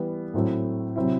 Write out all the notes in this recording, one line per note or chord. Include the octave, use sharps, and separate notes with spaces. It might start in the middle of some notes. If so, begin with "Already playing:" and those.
Already playing: E3 G3 B3
A2 F#3 C4 E4 A4
C3 F#3 C4 E4